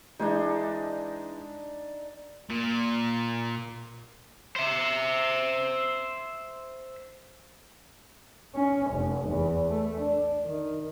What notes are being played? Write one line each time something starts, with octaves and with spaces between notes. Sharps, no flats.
E3 G#3 D4 D#4 G#4
A#2
C5 E5
C#4
F1
E2
A3
D4
D#3